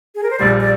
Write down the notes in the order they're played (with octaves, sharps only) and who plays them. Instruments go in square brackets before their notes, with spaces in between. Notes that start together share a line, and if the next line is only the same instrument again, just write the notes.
[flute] G#4
A#4
C5
[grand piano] A#1 A#2 G3 [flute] D5
[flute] D5